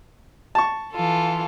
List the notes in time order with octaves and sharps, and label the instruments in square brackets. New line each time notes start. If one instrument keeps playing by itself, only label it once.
[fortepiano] A5 C#6
[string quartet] E3 F4 A4